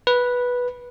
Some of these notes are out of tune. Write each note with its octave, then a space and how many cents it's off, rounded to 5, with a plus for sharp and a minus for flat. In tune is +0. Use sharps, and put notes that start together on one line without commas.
B4 -10